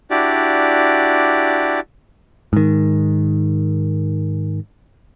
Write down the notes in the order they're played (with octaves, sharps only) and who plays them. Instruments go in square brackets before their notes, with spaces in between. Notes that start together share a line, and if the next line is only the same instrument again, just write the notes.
[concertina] D4 E4 F#4 G4 D5
[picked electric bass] G#2 D#3